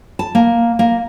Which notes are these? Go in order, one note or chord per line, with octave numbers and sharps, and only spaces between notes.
A5
A#3
A#3